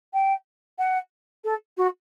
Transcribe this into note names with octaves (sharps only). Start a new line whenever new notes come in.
G5
F#5
A4
F#4